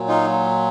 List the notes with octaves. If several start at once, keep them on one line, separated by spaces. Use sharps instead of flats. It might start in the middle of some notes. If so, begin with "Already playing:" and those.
Already playing: A#2 F#3
D#4 F4